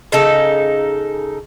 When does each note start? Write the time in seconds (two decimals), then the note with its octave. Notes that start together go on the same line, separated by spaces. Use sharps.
0.12 C#3 D#4 A4